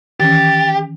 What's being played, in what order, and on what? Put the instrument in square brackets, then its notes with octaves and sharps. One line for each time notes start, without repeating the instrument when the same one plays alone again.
[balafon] D#3 E3 C#4 [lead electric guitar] G4 [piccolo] A6